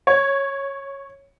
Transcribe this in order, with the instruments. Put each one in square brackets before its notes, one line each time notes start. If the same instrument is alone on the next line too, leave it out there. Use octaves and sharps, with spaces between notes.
[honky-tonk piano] C#5